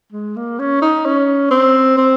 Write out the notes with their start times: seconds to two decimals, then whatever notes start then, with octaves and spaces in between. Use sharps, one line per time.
0.12 G#3
0.36 A#3
0.59 C#4
0.82 D#4
1.06 C#4
1.51 C4
1.97 C4